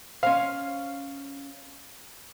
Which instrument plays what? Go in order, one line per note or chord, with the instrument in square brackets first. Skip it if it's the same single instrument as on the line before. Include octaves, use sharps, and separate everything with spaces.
[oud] C#4 C5 [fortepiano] F5